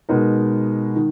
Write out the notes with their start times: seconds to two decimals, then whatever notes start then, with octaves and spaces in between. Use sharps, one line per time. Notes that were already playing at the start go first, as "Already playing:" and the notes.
0.09 B2 G#3 B3 D#4 A#4
0.96 D#3